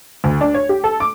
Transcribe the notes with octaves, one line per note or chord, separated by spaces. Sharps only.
D2
D4
C#5
G4
A4
D6